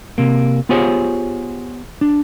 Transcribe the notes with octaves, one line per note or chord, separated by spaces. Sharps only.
C3 A#3
B3 F4 G4 G#4 C5 C#5
D4